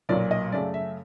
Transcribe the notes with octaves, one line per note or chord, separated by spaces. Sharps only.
B1 A#2 F#3 A#3 D5
D#5
F#2 C#3 F#3 A3 D5
E5